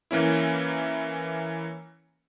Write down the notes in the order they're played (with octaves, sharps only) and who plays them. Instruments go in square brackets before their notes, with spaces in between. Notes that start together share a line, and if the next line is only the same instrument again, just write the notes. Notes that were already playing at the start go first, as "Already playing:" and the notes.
[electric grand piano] E3 A#3 C#4 E4